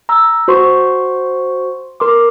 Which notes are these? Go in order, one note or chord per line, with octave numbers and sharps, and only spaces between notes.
A#5 E6
F#4 C5 C6 C#6
A#4 C6 D6